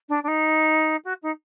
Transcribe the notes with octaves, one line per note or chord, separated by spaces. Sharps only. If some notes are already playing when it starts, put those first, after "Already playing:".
D4
D4
D#4
F#4
D#4